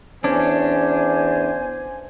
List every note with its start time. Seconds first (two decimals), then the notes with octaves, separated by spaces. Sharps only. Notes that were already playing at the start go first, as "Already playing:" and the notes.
0.24 E2 C#4 D4 C5 G#5